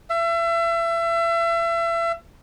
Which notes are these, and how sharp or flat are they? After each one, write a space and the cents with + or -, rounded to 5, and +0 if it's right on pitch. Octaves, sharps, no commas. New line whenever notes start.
E5 +35